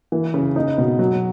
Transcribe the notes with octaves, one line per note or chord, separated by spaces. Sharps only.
E3
C#3
D#4
B2
F#3